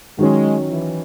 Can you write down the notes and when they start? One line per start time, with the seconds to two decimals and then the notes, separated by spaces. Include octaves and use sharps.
0.18 D#3 F#3 G#3 C#4
0.69 E3